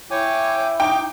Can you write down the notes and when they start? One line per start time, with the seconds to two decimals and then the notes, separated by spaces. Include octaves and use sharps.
0.11 E4 C#5 G5 G#5 D6
0.80 D#4 G5 D6